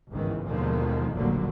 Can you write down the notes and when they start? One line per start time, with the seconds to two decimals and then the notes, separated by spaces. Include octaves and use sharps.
0.11 G1 C#2 G#2 D#3 E3
0.45 D#2 B2 D3 D#3 F3 G#3
1.14 F1 A#1 D3 F#3 G3 A#3